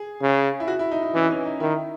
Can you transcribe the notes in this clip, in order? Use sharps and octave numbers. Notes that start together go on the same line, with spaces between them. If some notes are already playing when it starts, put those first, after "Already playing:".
Already playing: G#4
C#3
E4
F#4
E4
D#4
D#4
E3 C#4
C#4
D#4
D#3 E4